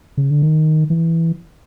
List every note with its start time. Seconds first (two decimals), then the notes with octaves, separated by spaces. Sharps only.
0.17 C#3
0.31 D3
0.42 D#3
0.90 E3